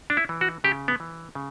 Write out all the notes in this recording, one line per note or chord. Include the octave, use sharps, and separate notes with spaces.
D4
E4
E3
F#4
C#3 G4
B3
E3
C#3